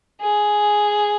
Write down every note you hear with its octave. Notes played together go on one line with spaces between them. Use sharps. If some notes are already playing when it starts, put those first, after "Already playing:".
G#4